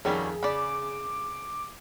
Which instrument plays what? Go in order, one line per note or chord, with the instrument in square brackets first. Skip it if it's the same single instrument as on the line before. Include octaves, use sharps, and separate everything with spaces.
[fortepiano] F2 D#3 [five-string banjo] F#3 G3 C#4 [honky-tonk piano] G#4
[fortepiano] C#3 [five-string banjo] D5 B5 [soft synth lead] D6